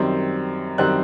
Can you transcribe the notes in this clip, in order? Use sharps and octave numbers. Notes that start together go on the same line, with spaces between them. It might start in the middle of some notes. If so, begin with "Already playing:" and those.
Already playing: F#2 D#3 G3 C4
F#2 D#3 G3 C4 F#6